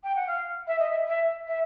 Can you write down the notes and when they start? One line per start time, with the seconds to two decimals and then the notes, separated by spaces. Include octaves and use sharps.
0.03 G5
0.15 F#5
0.27 F5
0.67 E5
0.79 D#5
0.90 E5
1.07 E5
1.47 E5